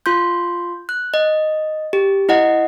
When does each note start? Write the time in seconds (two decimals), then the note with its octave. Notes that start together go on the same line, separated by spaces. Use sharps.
0.06 F4 C6 G6
0.89 F#6
1.14 D#5
1.93 G4
2.29 E4 D#5 F#5